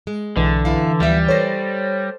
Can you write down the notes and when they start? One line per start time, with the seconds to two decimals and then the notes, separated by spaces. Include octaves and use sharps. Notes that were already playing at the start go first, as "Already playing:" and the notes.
0.07 G#3
0.37 B1 D3 E3
0.65 F#2 E4 F5
1.00 D2 F3 G3 B3 E5
1.28 A4 C5 C#5 A6 A#6